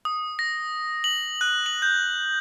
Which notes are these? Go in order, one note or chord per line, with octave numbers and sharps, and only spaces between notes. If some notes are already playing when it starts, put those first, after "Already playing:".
D#6
A#6
F#7
F#6
F#7
G6